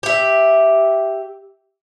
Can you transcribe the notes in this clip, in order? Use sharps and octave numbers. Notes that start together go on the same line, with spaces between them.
G4 E5